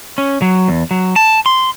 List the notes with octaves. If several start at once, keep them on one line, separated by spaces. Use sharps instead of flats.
C#4
F#3
E2
F#3
A5
C6